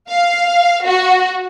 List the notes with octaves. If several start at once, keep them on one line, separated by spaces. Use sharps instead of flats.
F5
F#4